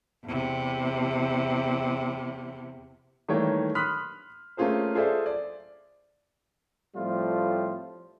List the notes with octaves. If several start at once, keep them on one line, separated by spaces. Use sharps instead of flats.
E2 C3
D#3 E3 G3 A3 A#3 C#5
B5 C6 D#6 F6 F#6 B6
A3 A#3 C#4 F4 G#4 C5
F4 G#4 A4 C5 D5 E5
D5
A2 F3 G3 A3 C4 F4